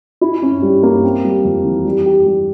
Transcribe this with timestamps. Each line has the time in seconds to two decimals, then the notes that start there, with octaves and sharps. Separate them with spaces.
0.21 E4
0.42 C#4
0.62 G3
0.83 A#3
1.04 C4
1.25 G3
1.45 F2
1.65 E3
1.85 G3
2.06 G4
2.26 G3